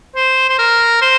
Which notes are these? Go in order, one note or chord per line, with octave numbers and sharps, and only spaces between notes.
C5
C5
A#4
C5